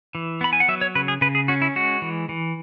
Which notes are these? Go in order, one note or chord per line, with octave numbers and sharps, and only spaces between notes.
E3
B3 B5
G#5
F#5
F#3 E5
C#5
C#3 B4
G#4
C#3 B4
G#4
C#4 F#4
E4
G#3 F#4
E3
E3